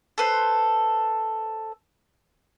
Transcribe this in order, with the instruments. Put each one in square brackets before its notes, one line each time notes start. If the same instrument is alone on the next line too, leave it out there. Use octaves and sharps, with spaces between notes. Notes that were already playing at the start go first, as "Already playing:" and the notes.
[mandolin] A4 B4 C5